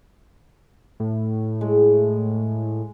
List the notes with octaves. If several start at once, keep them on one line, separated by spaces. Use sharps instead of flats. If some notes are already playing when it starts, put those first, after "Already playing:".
A2
G#3